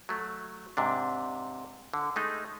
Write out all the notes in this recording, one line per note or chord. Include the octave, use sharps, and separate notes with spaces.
F#3 A3
G#2 C3 D4
D3
G#3 A3 D#4